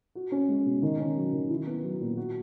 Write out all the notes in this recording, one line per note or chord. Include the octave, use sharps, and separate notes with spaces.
F#4
C#4
G#3
B2
D#3
C#4
F#3
D#3
E4
B3
F#3
A#2
F#4